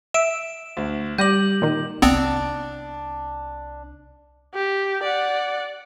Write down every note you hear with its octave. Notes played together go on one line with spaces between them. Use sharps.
E5 D7 E7
D2
G3 D6 G6 A#6 D#7 F#7
A#2 D#3
C2 B3 C4 D4
G4
D5 F#5